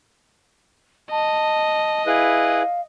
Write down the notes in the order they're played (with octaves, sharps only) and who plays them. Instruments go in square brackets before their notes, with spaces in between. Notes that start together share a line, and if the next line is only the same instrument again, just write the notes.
[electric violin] D#5 [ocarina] A5
[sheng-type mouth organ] E4 G#4 B4 [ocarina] F5